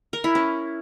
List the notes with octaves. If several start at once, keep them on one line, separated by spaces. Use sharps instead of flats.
A#4
E4
C#4